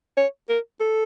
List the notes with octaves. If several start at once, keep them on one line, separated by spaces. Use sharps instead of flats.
C#5
A#4
A4